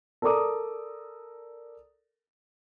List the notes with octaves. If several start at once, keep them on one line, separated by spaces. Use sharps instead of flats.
A4 A#4 D5 A#5 D6 D#6